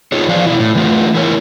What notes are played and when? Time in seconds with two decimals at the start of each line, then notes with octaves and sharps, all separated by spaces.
0.12 D#4 F4 G#4 C#5
0.28 E3 F3 D5 F5
0.47 B2 E3 E4
0.60 A2
0.75 E3 A3 F4
1.15 E4 A#4 C#5